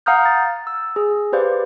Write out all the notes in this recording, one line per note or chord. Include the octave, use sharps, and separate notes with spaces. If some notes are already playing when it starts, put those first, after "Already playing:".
F5 F#5 A#5 D#6 F6 G6
A6
E6
G#4
G4 B4 C5 D5 F5